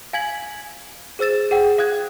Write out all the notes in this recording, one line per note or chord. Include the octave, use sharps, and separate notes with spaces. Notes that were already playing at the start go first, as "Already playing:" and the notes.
F5 G#5 G#6 B6 F#7
G#4 C5 E6 A6 E7
G#4 F#5 G5
F5 D#6 F#6 G#6